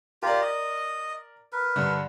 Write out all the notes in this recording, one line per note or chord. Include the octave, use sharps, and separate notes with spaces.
F4 G4 A#4 D5
D#5
A#4 B4
G2 D3